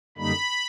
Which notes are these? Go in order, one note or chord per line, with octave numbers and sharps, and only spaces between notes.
F#2 D3 G3 A#3 D#4 B5